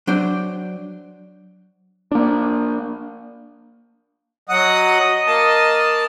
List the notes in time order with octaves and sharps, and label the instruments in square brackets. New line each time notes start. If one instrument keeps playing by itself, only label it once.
[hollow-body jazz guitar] F#3 D4 C5 G5
[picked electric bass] A#3 D4
[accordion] F#3 F#5 D#6 [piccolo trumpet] D#5
[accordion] A#3 A5